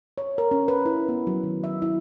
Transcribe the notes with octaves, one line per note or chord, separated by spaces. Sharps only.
C#5
A#4
C#4
B4
E4
B3
F#3
D#3
E5
E4